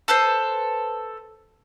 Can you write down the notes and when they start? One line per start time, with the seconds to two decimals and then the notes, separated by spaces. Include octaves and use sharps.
0.08 A4 B4 C5